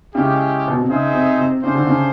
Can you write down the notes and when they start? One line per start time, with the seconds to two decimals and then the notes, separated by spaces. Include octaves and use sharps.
0.15 C#3 G#3 C#4 E4 G4
0.68 B2
0.79 C3
0.89 C#3 C4 D#4 G#4 C5 E5
1.14 C3
1.38 C3
1.63 C#3 A3 D4 G4 C5
1.75 D3
1.87 C#3